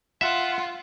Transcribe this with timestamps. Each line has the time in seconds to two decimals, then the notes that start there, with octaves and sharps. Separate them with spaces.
0.21 F4 E5 F#5